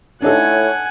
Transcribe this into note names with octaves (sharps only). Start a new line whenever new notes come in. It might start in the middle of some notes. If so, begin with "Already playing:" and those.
A2 D4 D#4 A4 C#5 F#5 G#5